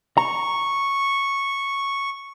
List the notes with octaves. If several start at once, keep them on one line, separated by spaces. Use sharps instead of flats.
A#5 C#6